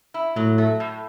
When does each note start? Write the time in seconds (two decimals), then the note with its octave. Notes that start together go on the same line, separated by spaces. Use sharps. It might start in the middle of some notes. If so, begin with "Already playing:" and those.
0.14 E4
0.36 A2 F#3
0.58 A3
0.80 A2